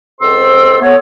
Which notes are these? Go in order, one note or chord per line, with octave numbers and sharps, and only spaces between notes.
C#2 C4 A4 C5 C6 E6
A3 B3 C#5